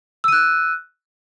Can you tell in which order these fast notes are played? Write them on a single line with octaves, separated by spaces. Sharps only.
E6 D#7 F#6